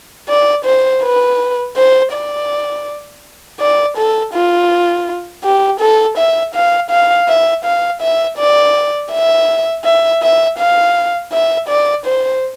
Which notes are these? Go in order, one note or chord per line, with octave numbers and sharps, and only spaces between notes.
D5
C5
B4
C5
D5
D5
A4
F4
G4
A4
E5
F5
F5
E5
F5
E5
D5
E5
E5
E5
F5
E5
D5
C5